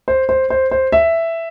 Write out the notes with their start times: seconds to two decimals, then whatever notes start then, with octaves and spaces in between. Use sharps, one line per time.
0.08 C5
0.29 C5
0.50 C5
0.71 C5
0.92 E5